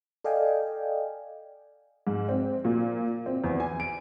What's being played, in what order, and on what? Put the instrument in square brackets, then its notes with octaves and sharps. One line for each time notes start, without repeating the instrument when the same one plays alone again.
[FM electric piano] A4 D5 D#5 F5 G5 G#5
[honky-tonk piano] G#2
C4
A#2
C4
E2
G#5
D7